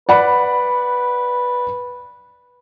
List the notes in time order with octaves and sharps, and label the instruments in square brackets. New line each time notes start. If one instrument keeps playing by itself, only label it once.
[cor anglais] B4 [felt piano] D5 F#5 B5